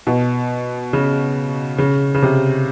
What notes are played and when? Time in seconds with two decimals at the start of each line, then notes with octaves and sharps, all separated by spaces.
0.07 B2
0.93 C#3
1.78 C#3
2.15 C#3
2.22 C3